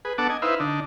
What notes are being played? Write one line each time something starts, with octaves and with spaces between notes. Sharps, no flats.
G#4 B4
B3 D4 A4 F#5 A5 D6
D#5 G#5
D#4 E4 B4 C5 E5 F5
D3 D4 D#4